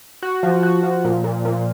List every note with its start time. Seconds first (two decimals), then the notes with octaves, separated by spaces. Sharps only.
0.22 F#4
0.43 F3
0.63 F#4
0.83 F3
1.05 A#2
1.24 A#2
1.45 A#2